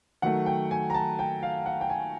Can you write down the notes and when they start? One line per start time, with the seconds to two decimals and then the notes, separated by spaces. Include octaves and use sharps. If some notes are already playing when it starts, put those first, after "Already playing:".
0.22 D#3 F#3 A3 F#5
0.46 G5
0.71 G#5
0.90 A#5
0.94 A5
1.19 G5
1.43 F5
1.66 F#5
1.81 G5
1.90 G#5